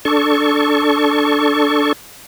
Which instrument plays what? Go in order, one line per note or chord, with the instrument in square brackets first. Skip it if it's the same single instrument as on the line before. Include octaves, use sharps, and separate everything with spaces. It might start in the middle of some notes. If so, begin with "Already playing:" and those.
[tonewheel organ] D4 A4 C#6